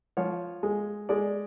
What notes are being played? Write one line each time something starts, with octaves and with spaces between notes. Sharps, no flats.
F3 C#5
G#3
G#3 D5